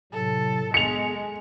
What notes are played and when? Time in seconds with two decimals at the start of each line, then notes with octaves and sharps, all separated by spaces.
0.13 A2 C3 F#3 A4
0.74 G#3 B3 G#4 C#7 F7